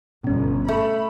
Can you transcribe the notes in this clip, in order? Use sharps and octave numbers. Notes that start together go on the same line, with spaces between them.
G1 B2 C#4
A3 B5